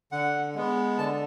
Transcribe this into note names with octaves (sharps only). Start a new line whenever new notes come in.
D3 F#5
G#3 B3
D3 A5